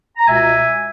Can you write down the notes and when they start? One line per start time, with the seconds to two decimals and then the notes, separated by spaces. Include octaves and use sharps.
0.16 A#5
0.27 C#2 B2 E5 G#5